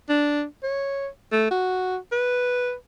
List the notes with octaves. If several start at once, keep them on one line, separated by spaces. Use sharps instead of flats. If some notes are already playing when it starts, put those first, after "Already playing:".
D4
C#5
A3
F#4
B4